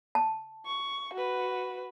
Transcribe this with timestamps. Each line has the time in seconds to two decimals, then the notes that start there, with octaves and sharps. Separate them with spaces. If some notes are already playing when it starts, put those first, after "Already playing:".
0.15 A5
0.66 C#6
1.13 F#4 B4